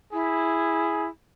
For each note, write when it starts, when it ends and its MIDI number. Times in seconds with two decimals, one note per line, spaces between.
0.13 1.08 64
0.13 1.08 68